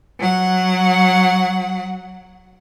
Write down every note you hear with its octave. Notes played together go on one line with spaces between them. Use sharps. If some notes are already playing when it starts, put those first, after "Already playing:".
F#3 F#5